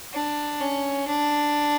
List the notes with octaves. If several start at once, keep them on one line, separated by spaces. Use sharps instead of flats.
D4
C#4
D4